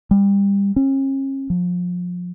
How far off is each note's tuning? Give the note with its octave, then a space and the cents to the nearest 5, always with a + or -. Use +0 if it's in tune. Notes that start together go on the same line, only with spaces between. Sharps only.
G3 +25
C#4 -40
F3 +30